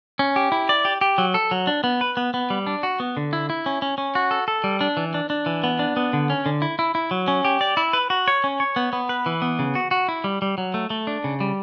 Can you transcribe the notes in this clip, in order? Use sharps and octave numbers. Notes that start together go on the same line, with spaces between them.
C#4
G4
E4
D5
G4
G4
F#3
A4
F#3
D4
B3
B4
B3
B3
G3
D4
F#4
B3
D3
E4
E4
C#4
C#4
C#4
F#4
A4
A4
G3
D4
E3
D4
D4
E3
B3
D4
B3
D3
C#4
D3
E4
E4
E4
F#3
C#4
G4
D5
E4
B4
F#4
C#5
C#4
C#5
B3
B3
B4
E3
B3
C#3
F#4
F#4
E4
G3
G3
F#3
A3
A3
D4
C#3
G3